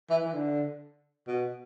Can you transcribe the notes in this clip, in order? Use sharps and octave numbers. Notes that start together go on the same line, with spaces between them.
E3
E3
D3
B2